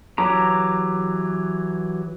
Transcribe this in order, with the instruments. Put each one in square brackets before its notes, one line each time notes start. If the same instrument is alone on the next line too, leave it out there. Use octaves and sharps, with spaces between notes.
[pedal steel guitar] E3 F#3 G4 A#5